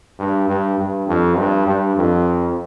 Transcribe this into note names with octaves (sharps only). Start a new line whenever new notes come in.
G2
G2
G2
F2
G2
G2
F2